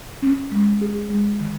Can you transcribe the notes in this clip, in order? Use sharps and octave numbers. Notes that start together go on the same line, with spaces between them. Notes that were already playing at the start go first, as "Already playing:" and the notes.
C#4
G#3
G#4
G#3
D#3